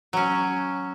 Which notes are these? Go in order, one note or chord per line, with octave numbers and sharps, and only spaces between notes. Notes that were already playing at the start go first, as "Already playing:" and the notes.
F#3 C#4